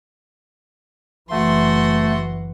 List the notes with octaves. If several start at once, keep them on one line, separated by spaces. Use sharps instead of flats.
F#1 E3 A3 F#4 C6